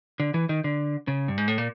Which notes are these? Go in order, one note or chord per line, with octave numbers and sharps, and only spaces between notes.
D3
E3
D#3
D3
C#3
G2
G#2
A2
A#2